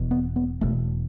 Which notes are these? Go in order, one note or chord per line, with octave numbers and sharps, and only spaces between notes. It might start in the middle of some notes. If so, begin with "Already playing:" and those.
Already playing: E1 E2 B2
B3
B3
E1 E2 B2 A3